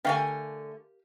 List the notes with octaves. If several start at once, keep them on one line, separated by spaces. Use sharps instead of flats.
D3 A3 G4 A#4 F5 G#5